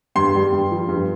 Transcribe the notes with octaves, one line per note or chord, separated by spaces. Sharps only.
G2 C6
G3
G2
F3
G2